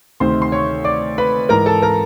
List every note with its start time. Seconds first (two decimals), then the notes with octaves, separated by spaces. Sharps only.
0.20 D2 C3 D#3 C5 C6
0.42 C6
0.52 C#5 C#6
0.84 D5 D6
1.18 B4 B5
1.49 G#2 E3 A#4 A#5
1.66 A4 A5
1.82 A#4 A#5